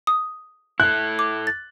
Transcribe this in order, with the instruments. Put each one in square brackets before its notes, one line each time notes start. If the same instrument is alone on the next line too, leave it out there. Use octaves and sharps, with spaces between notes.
[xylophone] D#6
[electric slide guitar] E4 A4 [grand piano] F#6
[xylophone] D6
A6